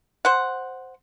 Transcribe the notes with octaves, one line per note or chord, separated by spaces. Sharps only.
C5 F#5